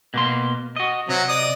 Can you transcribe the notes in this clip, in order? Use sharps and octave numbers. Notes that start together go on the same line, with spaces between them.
B2 A#3 C6
F#4 D#5
C3 F#3 C4
D5 D#5 D#6